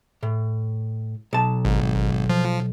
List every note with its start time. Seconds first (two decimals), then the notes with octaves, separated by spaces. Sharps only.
0.23 A2
1.33 B1 A5
1.65 G#1
2.30 F3